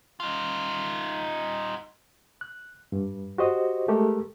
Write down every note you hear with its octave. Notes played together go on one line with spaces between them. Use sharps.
D#4 F4
F#6
G2
F#4 G4 C5 D#5
G#3 A3 G4 A4 A#4